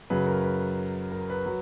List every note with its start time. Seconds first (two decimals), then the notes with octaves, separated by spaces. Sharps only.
0.10 F#2 C#3 F#3 B4
0.27 A#4
0.43 B4
1.12 A#4
1.30 B4
1.46 F#3